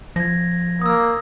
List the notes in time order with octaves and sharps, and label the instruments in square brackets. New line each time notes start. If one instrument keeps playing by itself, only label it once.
[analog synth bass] F3 [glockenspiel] G#6 A#6
[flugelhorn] A#3 [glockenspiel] D#6 E6